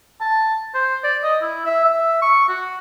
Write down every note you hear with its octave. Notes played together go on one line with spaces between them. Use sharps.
A5
C5
D5
D#5
E4
E5
E5
C#6
F#4